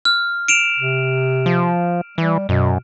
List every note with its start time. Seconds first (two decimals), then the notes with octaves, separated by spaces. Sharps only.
0.05 F6
0.48 D7 E7 F7
0.79 C3
1.46 F3
2.18 E3 G3
2.49 F#2 B2